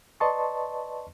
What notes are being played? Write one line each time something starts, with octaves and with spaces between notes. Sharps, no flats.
B4 D5 D#5 A5 C6 C#6